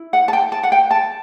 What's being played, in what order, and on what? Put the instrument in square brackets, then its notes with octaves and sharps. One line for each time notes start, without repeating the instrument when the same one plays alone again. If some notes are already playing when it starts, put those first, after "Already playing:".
Already playing: [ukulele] E4
F#5
A5
G5
A5
F#5
G5
A5